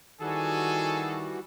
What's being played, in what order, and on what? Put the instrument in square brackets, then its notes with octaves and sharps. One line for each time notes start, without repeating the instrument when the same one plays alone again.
[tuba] D#3 [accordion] E3 G3 F#4 [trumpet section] G#4 A4 [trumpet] G#5